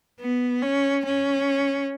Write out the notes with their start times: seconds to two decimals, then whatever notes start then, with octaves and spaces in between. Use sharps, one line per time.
0.21 B3
0.62 C#4
1.05 C#4